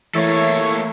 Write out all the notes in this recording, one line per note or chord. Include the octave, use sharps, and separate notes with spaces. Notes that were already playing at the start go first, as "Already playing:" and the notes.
E3 A3 A#3 E4 A4 C#5